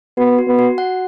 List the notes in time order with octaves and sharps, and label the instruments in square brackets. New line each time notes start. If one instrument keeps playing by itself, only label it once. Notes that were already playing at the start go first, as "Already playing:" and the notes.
[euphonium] B3 [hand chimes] F#4
[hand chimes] F#4
[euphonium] B3
[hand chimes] F#4
F#5